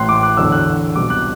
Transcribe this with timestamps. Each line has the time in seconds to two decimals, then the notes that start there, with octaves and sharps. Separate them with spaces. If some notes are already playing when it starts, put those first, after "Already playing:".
Already playing: A1 A2 E3 C6 F#6
0.09 D6
0.23 F#6
0.37 E2 D3 F#3 E6
0.52 F#6
0.96 C2 B2 F#3 D6
1.10 F#6